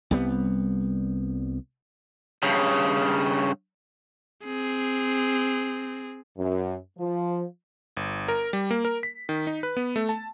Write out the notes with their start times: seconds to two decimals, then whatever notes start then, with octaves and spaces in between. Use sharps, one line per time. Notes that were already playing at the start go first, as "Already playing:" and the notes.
0.11 C2 G3 B3
2.43 G2 C#3
4.44 C4 G#4
6.37 F#2
6.98 F3
7.97 G1
8.28 A#4
8.53 G3
8.71 A#3
8.85 A#4
9.03 B6
9.29 D#3
9.47 D#4
9.63 B4
9.77 B3
9.96 A3
10.09 A5